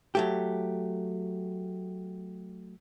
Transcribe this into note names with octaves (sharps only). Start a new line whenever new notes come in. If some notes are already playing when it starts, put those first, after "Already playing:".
F#3 A3 G4